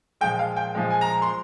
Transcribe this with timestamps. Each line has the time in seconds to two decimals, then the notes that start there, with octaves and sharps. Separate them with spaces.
0.21 A#2 F3 G#3 G5
0.39 F5
0.57 G5
0.75 A#2 F3 G#3
0.91 G#5
1.01 A#5
1.22 C6